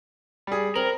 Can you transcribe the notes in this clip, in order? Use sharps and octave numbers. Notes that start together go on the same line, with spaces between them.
G3 G#4
C4 A#4 F#7